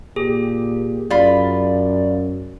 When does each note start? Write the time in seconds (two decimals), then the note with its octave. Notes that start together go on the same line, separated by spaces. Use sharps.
0.16 A#2 G4 G#4
1.10 F#2 F4 D5 B5